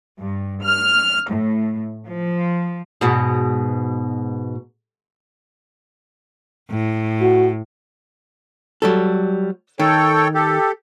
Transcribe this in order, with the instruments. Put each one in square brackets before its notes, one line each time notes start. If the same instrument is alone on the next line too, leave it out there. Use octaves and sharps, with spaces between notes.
[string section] G2
F6
A2
F3
[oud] G#2 B2 F#4
[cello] A2
[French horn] F#4
[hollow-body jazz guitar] F#3 G3 A4
[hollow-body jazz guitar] D#3 [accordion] A4 C#5 G5
[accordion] G4 A4